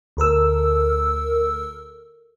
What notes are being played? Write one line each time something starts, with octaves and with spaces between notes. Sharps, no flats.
D2 A4 A#4 E6